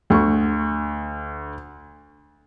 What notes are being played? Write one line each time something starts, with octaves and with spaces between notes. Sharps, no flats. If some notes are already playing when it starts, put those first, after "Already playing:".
D2 C#6